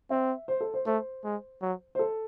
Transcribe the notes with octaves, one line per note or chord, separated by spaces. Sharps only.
C4 E5
C5
A4
C5
A3 C5
G#3
F#3
C5
A4